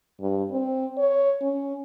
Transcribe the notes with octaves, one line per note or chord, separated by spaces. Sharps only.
G2
C4
C#5
C#4